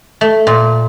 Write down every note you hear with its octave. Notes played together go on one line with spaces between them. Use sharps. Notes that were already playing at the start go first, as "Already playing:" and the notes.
A3
A#2